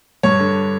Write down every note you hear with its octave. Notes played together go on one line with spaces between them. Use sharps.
G2 C#5
D3